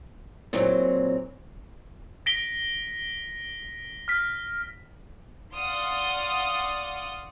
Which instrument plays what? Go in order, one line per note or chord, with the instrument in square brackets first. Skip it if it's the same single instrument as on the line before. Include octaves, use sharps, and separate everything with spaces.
[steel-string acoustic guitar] A#2 E3 F#3 C4
[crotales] A#6 B6 D7 G7
F6 B6
[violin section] D5 F5 F#5 C6 D#6 F6